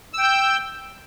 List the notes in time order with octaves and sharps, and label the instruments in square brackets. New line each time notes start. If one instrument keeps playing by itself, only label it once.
[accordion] E6
G5
G6